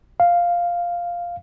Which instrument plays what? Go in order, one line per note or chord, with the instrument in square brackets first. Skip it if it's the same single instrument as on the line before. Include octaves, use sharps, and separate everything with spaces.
[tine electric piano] F5